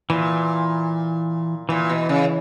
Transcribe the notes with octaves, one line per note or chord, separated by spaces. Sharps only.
A#2 E3
A#2 E3
B2
C#3